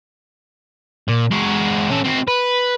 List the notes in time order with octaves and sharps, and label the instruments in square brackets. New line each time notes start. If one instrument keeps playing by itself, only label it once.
[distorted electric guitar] A#2
G#3 F#4
C#4 A4
C4 F#4
B4